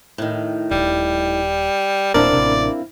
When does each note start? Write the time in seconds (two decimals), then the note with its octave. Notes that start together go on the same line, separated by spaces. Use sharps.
0.18 A2 D#3
0.71 D#1 G3
2.14 D#1 A#2 C4 D4 E4 A#4 D5 F5
2.33 A1 C3